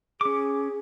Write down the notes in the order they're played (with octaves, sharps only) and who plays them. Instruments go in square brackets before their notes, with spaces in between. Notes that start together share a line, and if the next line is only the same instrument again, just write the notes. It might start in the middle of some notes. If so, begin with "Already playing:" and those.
[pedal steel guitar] C#4 D6 [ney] G#4